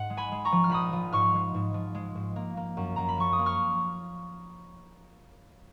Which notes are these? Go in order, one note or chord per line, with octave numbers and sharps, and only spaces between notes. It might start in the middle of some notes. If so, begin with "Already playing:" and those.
Already playing: G#2 F#5
G#3
G#5 B5
G#3
A#5 C#6
F3
F6
A#1 B5 D#6
F3
G#2 C#6 F6
G#3
G#2
F3
G#3
G#2
A#3
A#3
F#2
F#2 A#5
B5
F3 C#6
D#6
A#3
C#6 F6